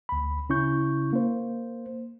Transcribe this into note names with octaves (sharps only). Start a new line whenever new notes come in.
D2 B5
C#3 C#4 E4 C#6 G6
A#3 C5